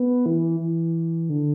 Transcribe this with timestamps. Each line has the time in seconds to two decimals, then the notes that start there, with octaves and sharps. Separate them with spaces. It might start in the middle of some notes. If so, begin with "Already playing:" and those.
Already playing: B3
0.26 E3
0.60 E3
1.29 D3